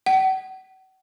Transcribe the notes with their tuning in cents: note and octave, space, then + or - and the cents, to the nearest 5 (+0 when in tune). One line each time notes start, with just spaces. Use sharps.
F#5 +40